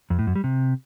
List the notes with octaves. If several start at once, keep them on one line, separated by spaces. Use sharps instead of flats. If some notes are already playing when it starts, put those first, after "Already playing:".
F2
A2
F#2
G3
C3